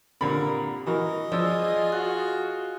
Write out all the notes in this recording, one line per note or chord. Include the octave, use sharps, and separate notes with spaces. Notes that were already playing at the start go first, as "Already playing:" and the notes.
A#2 D3 C4 G4 A#4 B5
E3 F#4 A#4 D#5
F3 F4 G#4 D5 E6 A6
F#4 F#6